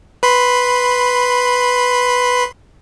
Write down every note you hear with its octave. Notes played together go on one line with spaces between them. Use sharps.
B4 B5 C6